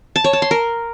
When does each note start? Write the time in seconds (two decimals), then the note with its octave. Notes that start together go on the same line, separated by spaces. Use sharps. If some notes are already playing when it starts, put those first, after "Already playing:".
0.16 A5
0.24 C#5
0.33 A5
0.42 C6
0.51 A#4